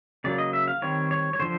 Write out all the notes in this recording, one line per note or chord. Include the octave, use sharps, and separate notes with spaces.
C#3 F#3 A#3 D5
D#5
E5
F5
D#3 G3 C4 C#5
C#5
C#5
D3 F3 C5